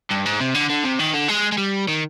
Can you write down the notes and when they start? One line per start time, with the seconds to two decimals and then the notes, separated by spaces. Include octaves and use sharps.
0.10 G2
0.25 G#2
0.40 C3
0.55 D3
0.70 D3
0.84 C3
0.99 D#3
1.14 D3
1.28 G#3
1.52 G#3
1.58 G3
1.88 D#3